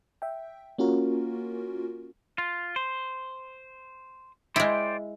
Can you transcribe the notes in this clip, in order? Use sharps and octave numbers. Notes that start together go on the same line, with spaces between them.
E5 G5
A#3 C#4 F4 F#4 A#4
F4
C5
G#3 E4 C5 D5 G5